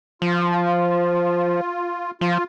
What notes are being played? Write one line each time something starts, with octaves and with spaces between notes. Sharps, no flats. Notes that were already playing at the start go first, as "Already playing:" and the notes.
F3 F4
F3 F4